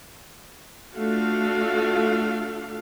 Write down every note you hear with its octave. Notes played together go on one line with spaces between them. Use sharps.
A3 D4 F4 F#4 A4 F5